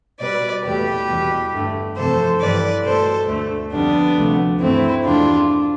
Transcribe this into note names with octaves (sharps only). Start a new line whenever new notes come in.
B2 G3 B4 D5
E2 B2 A3 G4 B4
E2 B2 G3
G2 D3 A3
F2 C3 E3 A3 A4 C5
G2 E3 G3 B4 D5
B2 A3 A4 C5
D2 D3 A3
F2 D3 G3 B3 D4
D2 C3 F3 A3
G2 E3 A3 C4 E4
E2 B2 A3 D4 F4